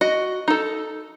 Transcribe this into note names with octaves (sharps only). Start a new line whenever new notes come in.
F#4 D#5
D#4 A4